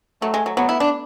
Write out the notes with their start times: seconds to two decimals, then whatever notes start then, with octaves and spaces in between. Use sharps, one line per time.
0.22 F#3 A3
0.34 G#3
0.46 F#3
0.57 F#3 B3
0.69 E4
0.80 D4